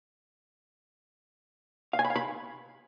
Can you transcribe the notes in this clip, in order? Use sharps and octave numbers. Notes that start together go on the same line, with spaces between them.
F5
G#5
B5
F5
B5